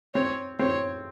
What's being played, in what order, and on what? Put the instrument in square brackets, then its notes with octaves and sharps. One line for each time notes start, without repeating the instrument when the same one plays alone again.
[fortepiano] C4 [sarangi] C#5
[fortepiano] C4 [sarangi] C#5